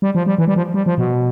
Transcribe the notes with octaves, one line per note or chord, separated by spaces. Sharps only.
G3
F3
G3
E3
G3
F3
G3
F3
B2